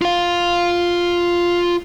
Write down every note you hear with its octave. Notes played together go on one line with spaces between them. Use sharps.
F4 F5